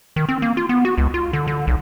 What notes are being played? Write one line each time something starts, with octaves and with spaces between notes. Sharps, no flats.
D#3
C4
A#3
F4
B3
F#4
C#2
F4
D3
D3
B1